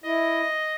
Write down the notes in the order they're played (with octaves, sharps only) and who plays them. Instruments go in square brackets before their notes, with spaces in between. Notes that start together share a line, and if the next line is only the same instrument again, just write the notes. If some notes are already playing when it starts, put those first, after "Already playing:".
[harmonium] E4 [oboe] D#5